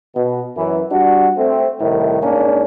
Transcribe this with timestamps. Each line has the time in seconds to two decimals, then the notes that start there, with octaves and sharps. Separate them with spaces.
0.15 B2
0.56 F#2 E3
0.91 G3 D4 F#4
1.38 A3 C4
1.81 C2 A2 D#3
2.22 G#2 A#3 C#4 D4